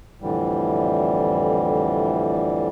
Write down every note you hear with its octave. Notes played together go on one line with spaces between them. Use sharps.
F2 A2 D3 E3 G3